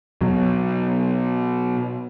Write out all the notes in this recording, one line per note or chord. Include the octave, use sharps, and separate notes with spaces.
B2 F#3